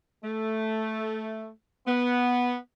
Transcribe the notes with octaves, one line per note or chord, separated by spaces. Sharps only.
A3
B3